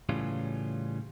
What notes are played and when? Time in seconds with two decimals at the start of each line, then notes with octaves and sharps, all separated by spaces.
0.09 A2 C#3 E3 G3 C#4 F4